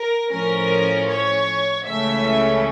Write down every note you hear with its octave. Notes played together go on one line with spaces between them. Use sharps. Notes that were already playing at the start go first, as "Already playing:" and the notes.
Already playing: A#4
A2 F3 C#4 A#4
C#5
C#2 C#3 E3 A3 C#4 E5